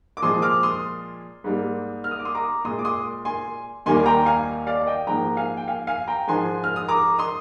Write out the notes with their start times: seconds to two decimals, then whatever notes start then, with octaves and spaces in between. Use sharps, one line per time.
0.17 D6
0.22 A#2 F3 G#3 C6 D#6
0.42 D6 F6
0.63 C6 D#6
1.44 G#2 G3 A#3
2.04 F6
2.11 D#6
2.19 D6
2.25 C6 D#6
2.35 A#5 D6
2.65 A#2 G#3 C6 D#6
2.79 D6
2.85 C6 D#6
3.25 G#5 C6
3.86 D#2 D#3 G3 A#3 G#5 C6
4.06 G5 A#5
4.26 F5 G#5
4.67 D5 F5
4.87 D#5 G5
5.07 G#2 F3 A#3 G5 A#5
5.37 F5 G#5
5.57 G5
5.68 F5 G#5
5.87 F5 G#5
6.07 G5 A#5
6.28 G#2 F3 G#3 G#5 C6
6.64 F6
6.76 D#6
6.88 A#5 D6
7.19 C6 D#6